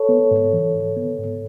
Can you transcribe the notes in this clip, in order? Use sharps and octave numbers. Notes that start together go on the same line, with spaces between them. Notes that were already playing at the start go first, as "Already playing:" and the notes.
Already playing: A4 C#5
B3
G#2
E3
G#2
B3
G#2